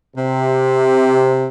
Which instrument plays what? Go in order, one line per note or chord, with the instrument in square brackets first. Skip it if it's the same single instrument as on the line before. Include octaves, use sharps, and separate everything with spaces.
[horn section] C3